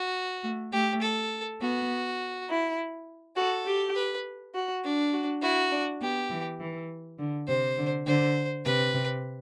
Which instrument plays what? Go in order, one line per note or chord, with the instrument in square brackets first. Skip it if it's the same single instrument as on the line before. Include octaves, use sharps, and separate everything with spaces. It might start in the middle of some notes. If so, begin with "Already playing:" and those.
Already playing: [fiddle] F#4
[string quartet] A3
[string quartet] A3 [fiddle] G4
[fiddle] A4
[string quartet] B3 [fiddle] F#4
[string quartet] E4
[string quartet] F#4 [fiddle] A4
[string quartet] G4
[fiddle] B4
[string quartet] F#4
[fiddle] D4
[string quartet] F#4
[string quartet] E4 [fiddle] F#4
[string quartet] D4
[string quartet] B3 [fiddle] G4
[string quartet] E3
E3
D3
[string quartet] C3 [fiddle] C5
[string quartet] D3
[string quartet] D3 [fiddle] C5
[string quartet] C3 [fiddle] B4
[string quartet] C3